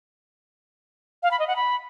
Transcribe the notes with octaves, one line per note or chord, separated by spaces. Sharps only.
F5
B5
D#5
F#5
B5